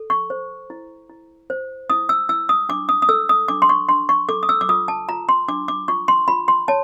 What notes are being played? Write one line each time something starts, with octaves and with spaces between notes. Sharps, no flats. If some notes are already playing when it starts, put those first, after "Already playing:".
Already playing: A4
C#6
C5
E4
E4
C5
E4 D#6
E6
E4 E6
D#6
D4 D6
D#6
D#6
A4 E6
D#6
D4 D6
C6
C#6
D4 C6
C#6
A4 D6
D#6
E6
D6
F4 D#6
A5
F4 A#5
C6
D4 D6
D6
F4 C#6
C6
F4 B5
C6
C#5 A5